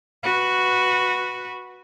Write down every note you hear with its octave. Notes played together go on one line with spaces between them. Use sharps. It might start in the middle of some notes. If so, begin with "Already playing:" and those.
F#4 B4